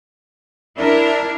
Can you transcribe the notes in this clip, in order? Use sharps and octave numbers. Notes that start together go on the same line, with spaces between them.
D4 E4 A#4